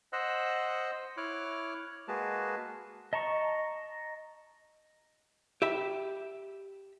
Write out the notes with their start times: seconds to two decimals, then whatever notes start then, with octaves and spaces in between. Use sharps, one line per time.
0.13 C5 D#5 F#5 E6 F#6
1.17 E4 C#5 D6 F6 F#6
2.08 G#3 A#3 F#4 G#4 B4 A5
3.13 D#5 A5 A#5 C#6
5.62 G4 E5 B5